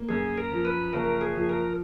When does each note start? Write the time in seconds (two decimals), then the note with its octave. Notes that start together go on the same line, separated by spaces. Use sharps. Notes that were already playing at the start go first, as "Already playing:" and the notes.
Already playing: A#3
0.09 F#2 G#4
0.38 A#4
0.52 F3
0.65 B4
0.93 F#1 A#4
1.21 G#4
1.35 F3
1.49 A#4